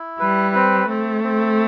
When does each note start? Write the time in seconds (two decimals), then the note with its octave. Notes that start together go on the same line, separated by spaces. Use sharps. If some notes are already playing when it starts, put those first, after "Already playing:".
Already playing: E4
0.20 G3 B4
0.55 C4
0.89 A3 C4
1.24 C4